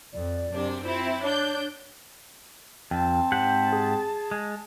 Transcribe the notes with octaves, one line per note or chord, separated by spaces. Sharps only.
F2 D5
F#2 C3 D4
C4 E4 F4
D4 C#5 G6
F2 C4 G5 A5
G#2 G4 F#5
G#4
G#3